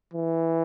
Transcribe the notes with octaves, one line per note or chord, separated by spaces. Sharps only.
E3